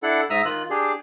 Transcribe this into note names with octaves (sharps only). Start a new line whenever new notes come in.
D4 E4 A4 F#5
G#2 E5 A#5 D#6 E6
D#3 F4 F#6
D4 G4 G#4